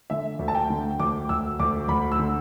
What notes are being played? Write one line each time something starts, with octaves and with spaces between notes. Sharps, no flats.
D3 E5
D2
A5
G5
D3
D2 D6
D2 E6
D2 D6
D2 B5
E6
D3